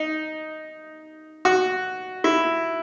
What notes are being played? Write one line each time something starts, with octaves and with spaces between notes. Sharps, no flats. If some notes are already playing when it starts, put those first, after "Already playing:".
Already playing: D#4
F#4
E4